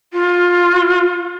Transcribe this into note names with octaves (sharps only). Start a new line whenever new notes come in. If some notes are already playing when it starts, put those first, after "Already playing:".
F4